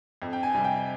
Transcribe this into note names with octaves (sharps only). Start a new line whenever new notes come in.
F2
G5
G#5
C3 G3
G5